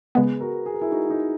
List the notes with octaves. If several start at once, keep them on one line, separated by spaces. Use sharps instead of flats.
C#3 G#3 B3 G#4 B4
F#4 A#4
G#4
A#4
E4 G#4
D#4 F#4
D#4